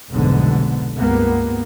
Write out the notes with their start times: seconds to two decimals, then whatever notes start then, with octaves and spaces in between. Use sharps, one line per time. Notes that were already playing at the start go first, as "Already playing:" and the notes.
0.11 F1 B1 G#2 D3 B3
0.96 C#2 G2 A#3 B3